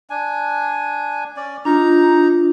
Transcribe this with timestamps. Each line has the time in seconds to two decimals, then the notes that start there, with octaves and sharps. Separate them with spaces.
0.10 D4 G#5
1.36 C#4 D5
1.65 D4 D#4 F4 A#5